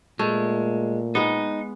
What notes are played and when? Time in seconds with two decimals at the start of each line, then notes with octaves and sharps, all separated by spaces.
0.19 A#2 G#3 A3
1.15 G#3 B3 D#4